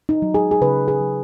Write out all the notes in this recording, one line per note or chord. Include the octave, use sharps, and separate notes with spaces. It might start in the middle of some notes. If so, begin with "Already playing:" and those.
D#4
F#3
G#4
G#4
C#3 B4
G#4
F#3